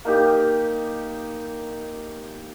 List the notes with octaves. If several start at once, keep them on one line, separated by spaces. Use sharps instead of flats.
A#3 D#4 G4